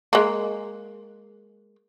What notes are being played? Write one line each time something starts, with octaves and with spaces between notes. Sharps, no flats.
G#3 A#3